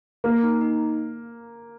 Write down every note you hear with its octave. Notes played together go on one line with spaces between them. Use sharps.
A#3 A#4
D#4
D#4